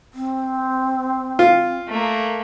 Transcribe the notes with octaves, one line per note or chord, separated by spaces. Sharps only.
C4
F4
A3 A#3